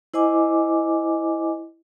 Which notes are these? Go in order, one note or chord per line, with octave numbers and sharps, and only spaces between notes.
E4 C5 D#5 G#5 D6